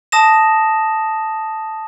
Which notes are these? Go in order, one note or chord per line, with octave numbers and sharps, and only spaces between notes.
A5 D#6 A#6 E7